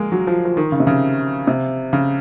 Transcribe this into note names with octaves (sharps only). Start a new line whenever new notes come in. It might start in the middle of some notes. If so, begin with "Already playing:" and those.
Already playing: G#3 A#3
F#3
F3
F3
D#3
C#3
C3
C#3
C3
C#3